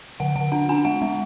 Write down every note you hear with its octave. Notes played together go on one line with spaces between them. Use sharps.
D3 F#5
D3 F#5
D4 F#5
D4 G#5
G#3 F#5
G#3